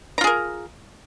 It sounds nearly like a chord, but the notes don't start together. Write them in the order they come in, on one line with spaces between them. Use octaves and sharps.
A#5 F4 G#4 A#4